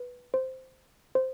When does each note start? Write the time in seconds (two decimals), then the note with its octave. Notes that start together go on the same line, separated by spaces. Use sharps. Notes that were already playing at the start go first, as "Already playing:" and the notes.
Already playing: B4
0.34 C5
1.15 C5